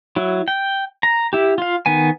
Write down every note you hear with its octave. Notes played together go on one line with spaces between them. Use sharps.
F#3 E4
G5
A#5
E4 G4
F4 F5
D#3 B3 G#5